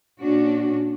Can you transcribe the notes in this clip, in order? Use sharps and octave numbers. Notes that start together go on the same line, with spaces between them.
A#2 C#4 D4 F#4